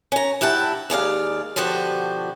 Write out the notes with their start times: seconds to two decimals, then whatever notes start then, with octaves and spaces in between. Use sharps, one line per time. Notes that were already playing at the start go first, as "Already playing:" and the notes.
0.12 C#4 A#5
0.41 G2 E4 F#5 G5 A5
0.90 D#2 G#3 D5 F5
1.56 B2 D3 F3 F#4 G4